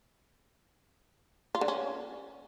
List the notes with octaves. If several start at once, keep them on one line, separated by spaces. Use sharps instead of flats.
F4
D3
C#4